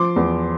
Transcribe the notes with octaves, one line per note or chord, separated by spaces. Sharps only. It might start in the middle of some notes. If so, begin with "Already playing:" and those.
Already playing: F3 C6 D6
E2